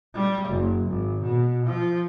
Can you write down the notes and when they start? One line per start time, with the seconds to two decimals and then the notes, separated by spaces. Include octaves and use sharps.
0.14 G3
0.49 F#1
0.87 G#1
1.23 B2
1.66 F3